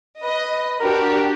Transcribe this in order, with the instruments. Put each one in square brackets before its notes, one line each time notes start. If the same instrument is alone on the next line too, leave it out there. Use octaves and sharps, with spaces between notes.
[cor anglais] B4 [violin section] D#5
[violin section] D4 F#4 G4 [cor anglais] A#4